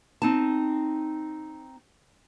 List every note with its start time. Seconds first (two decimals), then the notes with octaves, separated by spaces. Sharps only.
0.22 C4 D#4 A5